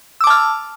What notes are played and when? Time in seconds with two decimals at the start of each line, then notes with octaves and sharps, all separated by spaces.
0.21 E6
0.24 D6
0.27 A5
0.30 F6